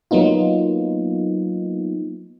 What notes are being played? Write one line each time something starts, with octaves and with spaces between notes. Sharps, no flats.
F#3 A#3 B3 D#4 F4